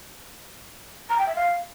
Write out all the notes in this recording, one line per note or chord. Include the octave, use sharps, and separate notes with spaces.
A#5
G5
E5
F5